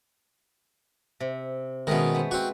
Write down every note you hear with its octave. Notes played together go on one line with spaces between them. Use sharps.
C3
B2 D#3 G#3 A3 C#4
B3 C5
C4 F#4